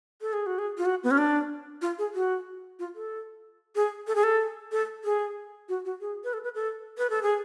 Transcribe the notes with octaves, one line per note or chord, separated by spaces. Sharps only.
A4
G#4
F#4
G#4
F4
F#4
B3
C#4
D4
F4
G#4
F#4
F4
A4
G#4
A4
G#4
A4
A4
G#4
F#4
F#4
G#4
B4
A4
B4
A4
B4
A4
G#4